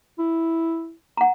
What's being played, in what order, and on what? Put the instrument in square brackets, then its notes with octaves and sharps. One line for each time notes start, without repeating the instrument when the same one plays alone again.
[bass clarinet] E4
[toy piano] F#5 A#5